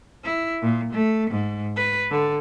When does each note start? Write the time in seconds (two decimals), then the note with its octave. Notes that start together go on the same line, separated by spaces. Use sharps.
0.24 E4
0.62 A#2
0.93 A3
1.30 G#2
1.76 B4
2.11 D3